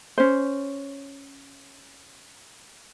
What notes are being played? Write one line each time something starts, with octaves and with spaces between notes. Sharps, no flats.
C#4 C5